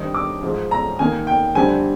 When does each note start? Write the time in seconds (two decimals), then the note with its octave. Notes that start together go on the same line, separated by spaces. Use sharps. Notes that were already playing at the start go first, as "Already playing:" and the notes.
Already playing: G2 D#3 G3 C4 D#4
0.14 D6
0.43 G#2 F3 G#3
0.71 A#5
0.99 D#3 A#3 D#4 G#5
1.27 G5
1.55 F2 D3 G3 C4 G#5